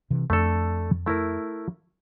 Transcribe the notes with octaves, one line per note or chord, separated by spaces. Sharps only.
C3 E3
F2 A3 D4 A4
A3 E4 A#4